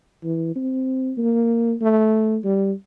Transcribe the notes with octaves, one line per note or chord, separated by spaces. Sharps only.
E3
C4
A#3
A3
G3